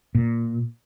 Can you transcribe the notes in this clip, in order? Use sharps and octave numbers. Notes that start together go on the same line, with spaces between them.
A#2